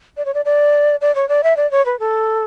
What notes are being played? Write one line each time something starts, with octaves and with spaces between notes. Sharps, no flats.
D5
C#5
D5
D5
D5
C#5
D5
E5
D5
C#5
B4
A4